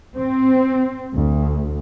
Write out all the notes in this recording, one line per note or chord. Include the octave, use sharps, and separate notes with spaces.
C4
D2